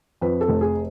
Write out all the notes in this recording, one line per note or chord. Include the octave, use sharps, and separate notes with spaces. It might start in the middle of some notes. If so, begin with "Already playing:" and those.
F2 B4
A4
F1
G#4